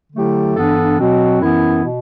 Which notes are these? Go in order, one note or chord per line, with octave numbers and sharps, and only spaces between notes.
D3 F#3 A3 E4 G4
G2 E3 B3 D4 A4
B2 F#3 C4 F#4
F#2 E3 B3 E4
B2